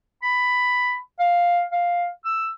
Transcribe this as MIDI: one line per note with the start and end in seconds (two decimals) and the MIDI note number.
0.23 0.97 83
1.20 1.62 77
1.72 2.08 77
2.25 2.48 88